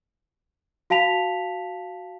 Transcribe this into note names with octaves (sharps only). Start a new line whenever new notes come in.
F#4 F5 A5 B6 F7